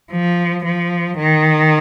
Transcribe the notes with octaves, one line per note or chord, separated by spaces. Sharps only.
F3
F3
D#3